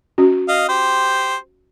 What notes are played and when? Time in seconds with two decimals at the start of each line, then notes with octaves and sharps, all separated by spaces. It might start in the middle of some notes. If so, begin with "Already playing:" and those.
0.18 C#4 F#4
0.49 D#5 F5
0.69 G4 C5